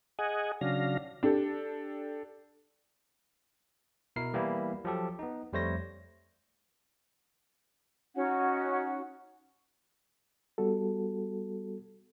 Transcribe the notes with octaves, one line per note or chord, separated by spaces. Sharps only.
G#4 D#5 F#5 G#5
C#3 F#3 D4 F5 A#6
D4 G4 A4
B2 E4 A#4 C7
E3 G3 A#3 B3 E4
F3 F#3 G4 A4
B3 D#4
F2 G3 A3 C5 C#5 A#6
C#4 D#4 F#4 F#5
G3 B3 F#4 A4